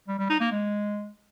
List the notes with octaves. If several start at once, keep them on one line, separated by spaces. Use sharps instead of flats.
G3
G3
D#4
A#3
G#3